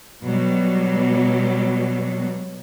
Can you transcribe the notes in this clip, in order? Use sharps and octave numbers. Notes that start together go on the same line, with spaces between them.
B2 F#3 G3